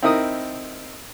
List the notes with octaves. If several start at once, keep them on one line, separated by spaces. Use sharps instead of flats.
C4 D#4 E4 A#4 D#6